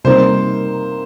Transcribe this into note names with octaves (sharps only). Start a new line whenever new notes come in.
C3 G3 A#3 D#4 C5